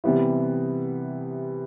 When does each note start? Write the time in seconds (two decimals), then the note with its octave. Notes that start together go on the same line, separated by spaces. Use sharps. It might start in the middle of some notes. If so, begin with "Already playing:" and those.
0.04 C3 E3 G3 B3 E4